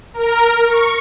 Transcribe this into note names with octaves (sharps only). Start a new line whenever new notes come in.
A#4
C#6